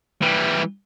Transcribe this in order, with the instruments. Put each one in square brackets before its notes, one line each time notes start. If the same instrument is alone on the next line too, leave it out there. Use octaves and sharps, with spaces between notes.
[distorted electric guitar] E3 G3